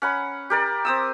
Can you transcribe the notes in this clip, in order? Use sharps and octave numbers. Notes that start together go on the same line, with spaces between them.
C#4 F#5 B5
G4 A#4 D5
C4 D#6 E6